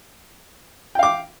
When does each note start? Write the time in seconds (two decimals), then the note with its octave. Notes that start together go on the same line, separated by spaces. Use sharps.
0.95 G5
0.99 F5
1.03 D6